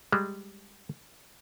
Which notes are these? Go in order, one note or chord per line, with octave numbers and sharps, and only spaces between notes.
G3 G#3